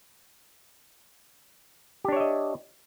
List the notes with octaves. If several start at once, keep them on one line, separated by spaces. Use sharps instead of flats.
D4 G4 C#5 D#5 E5